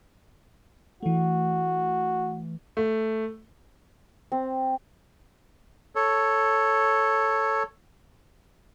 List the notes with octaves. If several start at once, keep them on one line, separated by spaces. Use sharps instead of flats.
E3 A3 F#4
A3
C4
A4 C#5